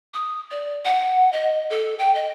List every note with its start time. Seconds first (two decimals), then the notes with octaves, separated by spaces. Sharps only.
0.14 D#6
0.51 D5
0.85 F#5
1.33 D#5
1.70 A4
1.99 G5
2.15 D#5